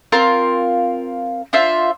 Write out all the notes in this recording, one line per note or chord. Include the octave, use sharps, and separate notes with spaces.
C4 F4 A#4
D4 F4 C5 E5